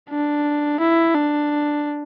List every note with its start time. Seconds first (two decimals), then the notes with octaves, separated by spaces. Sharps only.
0.10 D4
0.80 E4
1.15 D4